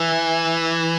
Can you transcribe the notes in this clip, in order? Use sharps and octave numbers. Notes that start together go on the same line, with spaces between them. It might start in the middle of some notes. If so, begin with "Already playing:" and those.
Already playing: E3